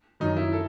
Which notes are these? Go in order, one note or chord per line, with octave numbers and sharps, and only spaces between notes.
F#2 D#3 D#4
E4
A4